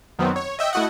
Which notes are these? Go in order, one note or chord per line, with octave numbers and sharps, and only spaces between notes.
F#2 D#3 F#3 B3 C4
C#5
D#5 E5 G5
A3 E4 F#4 D#5 F#5